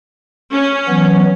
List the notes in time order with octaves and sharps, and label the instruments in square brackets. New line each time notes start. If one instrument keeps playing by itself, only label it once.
[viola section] C#4
[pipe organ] E3 F#3 B3